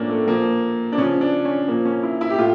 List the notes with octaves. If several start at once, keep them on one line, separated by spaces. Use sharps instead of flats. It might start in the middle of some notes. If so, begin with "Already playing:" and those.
Already playing: A2 F3 A#3 C#4 D4
A3
A#2 F3 A#3
D4
C#3 F3 C#4
D4
C#4
A#2 F3 A#3
C#4
E4
E4
G4
A2 F4